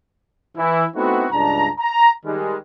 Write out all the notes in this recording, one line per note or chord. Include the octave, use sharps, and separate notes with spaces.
E3 E4
A3 B3 C4 D#4 E4 F#4
C#2 G2 D4 A5 A#5
A#5
D#3 G3 G#3